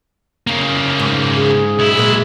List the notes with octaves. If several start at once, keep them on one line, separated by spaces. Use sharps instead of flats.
C#3 A#3
G#2
G#4
B1 E4
A#2 G#3